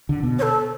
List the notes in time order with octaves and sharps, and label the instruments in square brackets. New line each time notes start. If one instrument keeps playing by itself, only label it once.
[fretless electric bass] D3
B2
[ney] C#5
A4